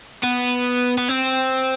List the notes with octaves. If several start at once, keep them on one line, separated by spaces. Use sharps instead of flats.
B3
B3
C4